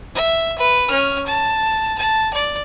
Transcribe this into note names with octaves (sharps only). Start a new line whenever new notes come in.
E5
B4
C#4 F6
A5
A5
D5